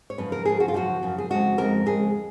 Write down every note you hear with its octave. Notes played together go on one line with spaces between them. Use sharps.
C#5
F#2 C#3 F3 B4
A#4
F#2 C#3 F3 G#4
F#4
F4
F#2 C#3 F3 F#4
F#2 C#3 F3
G#4
F2 C#3 G#3 F#4
F2 C#3 G#3 A#4
F2 C#3 G#3 G#4